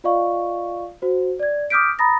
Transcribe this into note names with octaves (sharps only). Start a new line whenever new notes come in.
F4 D5 D#5 F5 C#6
F#4 C5
D5 G#6
D6 D#6 F6 G6 B6 D7
A#5 B5 D#6 A6 A#6